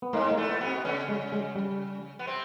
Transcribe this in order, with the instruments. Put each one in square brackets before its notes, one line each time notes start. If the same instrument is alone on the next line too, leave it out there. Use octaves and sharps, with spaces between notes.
[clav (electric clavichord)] B3
[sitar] G#2 G#3 [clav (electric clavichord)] A#3
[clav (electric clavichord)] A#3
[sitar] A2 A3
[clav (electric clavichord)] B3
[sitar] B2 B3
[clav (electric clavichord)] C4
[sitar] C#3 C#4 [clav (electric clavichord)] B3
[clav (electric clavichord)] G#3
G#3
G3
[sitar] B3
C3 C4